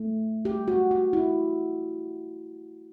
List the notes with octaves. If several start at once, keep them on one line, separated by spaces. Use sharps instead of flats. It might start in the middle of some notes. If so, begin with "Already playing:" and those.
Already playing: A3
G4
F#4
F#4
E4